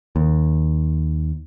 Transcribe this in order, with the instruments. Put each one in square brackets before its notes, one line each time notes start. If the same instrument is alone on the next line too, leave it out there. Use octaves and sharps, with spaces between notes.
[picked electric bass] D#2